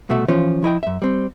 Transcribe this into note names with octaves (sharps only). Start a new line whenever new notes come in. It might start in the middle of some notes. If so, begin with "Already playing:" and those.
C2 B2 A3 F#4 E5
E3 F3 C#4 F4 C5 C#5
F3 E4 D#5 G5
F#2 E5
G3 C4